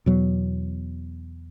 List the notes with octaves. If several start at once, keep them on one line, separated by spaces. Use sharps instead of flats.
E2 B2 F#3